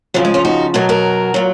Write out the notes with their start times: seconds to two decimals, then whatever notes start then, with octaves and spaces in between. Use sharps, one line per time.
0.14 C#3 F3 F#3
0.25 G#3
0.34 C#4 F4
0.45 D#4 F#4
0.74 B2 F#3 F#4 A#4
0.89 F#4 A#4
1.34 A#2 F#3